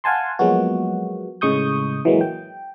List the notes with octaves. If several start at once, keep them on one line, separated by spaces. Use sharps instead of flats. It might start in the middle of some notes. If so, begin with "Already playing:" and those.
F5 F#5 G#5 A5 C6
F3 F#3 G#3 A#3 B3 F#4
A2 C#3 G#3 C#6 D#6 G6
E3 F#3 G#3 A#3
G5